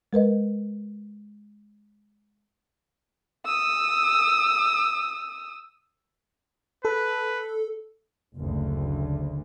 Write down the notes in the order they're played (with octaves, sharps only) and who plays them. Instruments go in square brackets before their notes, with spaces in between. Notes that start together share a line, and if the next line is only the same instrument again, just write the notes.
[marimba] G#3 A#4 B4 D#5
[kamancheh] D#6 E6
[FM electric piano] A4 [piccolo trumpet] B4
[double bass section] F#1 D2